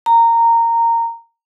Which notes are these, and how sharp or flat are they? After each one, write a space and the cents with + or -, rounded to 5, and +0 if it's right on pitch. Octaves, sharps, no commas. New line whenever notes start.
A#5 -15